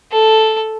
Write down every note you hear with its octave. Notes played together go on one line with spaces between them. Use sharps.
A4